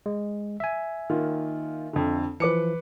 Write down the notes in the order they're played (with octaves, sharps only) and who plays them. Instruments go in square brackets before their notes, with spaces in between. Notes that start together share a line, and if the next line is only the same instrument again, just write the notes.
[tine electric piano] G#3
E5 G#5
[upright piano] D#3 A#3 F4
F2 D3
[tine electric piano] E3 F3 [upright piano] B4 D6 C#7